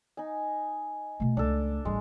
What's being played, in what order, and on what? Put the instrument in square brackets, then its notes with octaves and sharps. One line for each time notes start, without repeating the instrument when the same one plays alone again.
[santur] D#4 G#5
[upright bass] B2 A3
[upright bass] C#2 A3 [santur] D4 A4
[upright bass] A1 G2 [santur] G#3